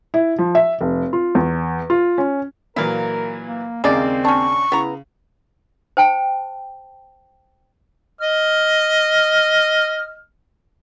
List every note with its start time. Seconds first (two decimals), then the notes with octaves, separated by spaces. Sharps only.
0.14 E4
0.39 F3
0.55 E5
0.81 F1
1.13 F4
1.35 E2
1.90 F4
2.18 C#4
2.76 A#2 E3 F#3 E4 A#4 F5
3.46 A#3
3.84 D#2 C#3 G#3 A#3 C4 D5
4.25 C#4 D4 C#6
4.72 C#3 B3 E4 A#5
5.97 C5 G5 A5
8.21 D#5 F6